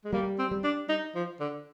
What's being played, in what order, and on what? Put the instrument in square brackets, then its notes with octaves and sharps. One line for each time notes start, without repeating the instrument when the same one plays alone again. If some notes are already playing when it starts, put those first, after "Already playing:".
[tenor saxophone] G#3
[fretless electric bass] G3 [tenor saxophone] A#3
[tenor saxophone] C4
[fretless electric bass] G3
[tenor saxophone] D4
D#4
F3
D3